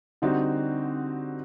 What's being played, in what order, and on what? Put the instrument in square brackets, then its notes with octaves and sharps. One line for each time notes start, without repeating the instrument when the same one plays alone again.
[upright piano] D3 G3 C4 D#4 F#4